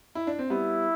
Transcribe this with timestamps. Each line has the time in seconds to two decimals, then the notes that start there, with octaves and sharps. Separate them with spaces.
0.15 E4
0.27 D4
0.39 C4
0.50 G3 B3 E4